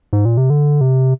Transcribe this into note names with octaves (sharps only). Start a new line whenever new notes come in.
G#2
A#2
C3
D3
C3